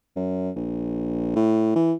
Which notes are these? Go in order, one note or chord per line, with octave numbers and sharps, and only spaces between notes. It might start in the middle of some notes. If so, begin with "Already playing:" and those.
F#2
A#1
A2
E3